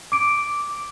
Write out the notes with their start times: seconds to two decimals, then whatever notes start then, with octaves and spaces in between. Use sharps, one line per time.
0.12 D6 D7